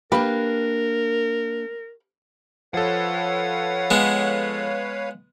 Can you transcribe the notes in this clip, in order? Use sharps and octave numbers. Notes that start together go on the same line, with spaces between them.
A#3 D4 G4 A#4 B4
F3 A4 B4 C#5 F5 F#5
G#3 B3